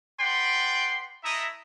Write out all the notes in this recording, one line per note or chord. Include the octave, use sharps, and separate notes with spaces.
B4 D5 F#5 G5 C6
A3 E4 D#5 E5 A#5 D#6